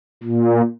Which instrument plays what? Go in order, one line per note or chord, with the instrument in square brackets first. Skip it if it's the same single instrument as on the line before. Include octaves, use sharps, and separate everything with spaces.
[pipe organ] A#2